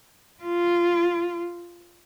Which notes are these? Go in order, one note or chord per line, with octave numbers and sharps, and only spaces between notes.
F4